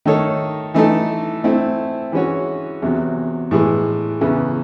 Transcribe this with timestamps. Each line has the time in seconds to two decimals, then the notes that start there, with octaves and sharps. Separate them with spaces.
0.06 D#3 A3 D#4 A4 C#5
0.74 E3 A3 D#4 A4
1.44 A3 C4 E4
2.12 E3 G#3 C#4 F#4 C#5
2.82 E2 C3 F#3
3.51 A2 E3 G#3
4.21 E2 C#3 E3